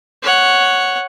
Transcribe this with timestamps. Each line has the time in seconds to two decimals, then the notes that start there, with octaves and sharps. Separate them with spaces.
0.23 C#5 F#5